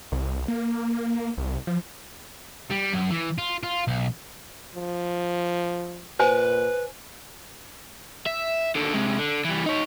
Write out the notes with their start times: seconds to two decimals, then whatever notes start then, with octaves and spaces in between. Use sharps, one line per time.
0.12 C2
0.48 A#3
1.37 C2
1.67 F3
2.71 G3
2.93 F#2
3.11 E3
3.38 F4
3.63 F4
3.87 B1
4.75 F3
6.19 A#2 B4 C5 G#5
8.26 E5
8.76 D#2 D3
8.94 C3 G#3
9.19 D3
9.45 E3 G3
9.66 D#4 C#5